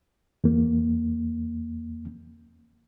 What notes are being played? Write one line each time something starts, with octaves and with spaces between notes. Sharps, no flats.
E2 A#3